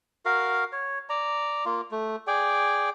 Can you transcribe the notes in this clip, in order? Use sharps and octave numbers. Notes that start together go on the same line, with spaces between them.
F#4 A#4 F5
C#5
D5 A#5
A#3 F4
A3
G#4 D5 G5